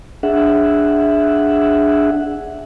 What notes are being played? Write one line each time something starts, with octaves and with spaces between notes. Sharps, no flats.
D4 G#4 E5 F#5